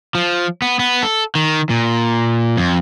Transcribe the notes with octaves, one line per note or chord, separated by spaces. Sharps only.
F3
B3
B3
A4
D#3
A#2
F2